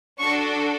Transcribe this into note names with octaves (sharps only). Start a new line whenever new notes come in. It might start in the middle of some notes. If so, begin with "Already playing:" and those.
D4 F#4 A4 C#6